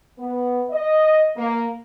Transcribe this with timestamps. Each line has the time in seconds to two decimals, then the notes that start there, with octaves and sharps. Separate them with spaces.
0.18 B3
0.70 D#5
1.37 A#3